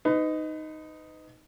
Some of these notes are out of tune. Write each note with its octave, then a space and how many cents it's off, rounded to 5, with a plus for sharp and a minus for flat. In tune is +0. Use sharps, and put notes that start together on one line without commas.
D#4 +0 B4 +35